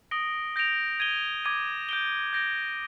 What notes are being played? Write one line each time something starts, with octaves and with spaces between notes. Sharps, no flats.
D#6 A#6 D7 G7
G6 A#6 D7 F7
G#6 D#7 G7
D6 G#6 D#7
G6 D7 G7
G6 A#6 D7 G7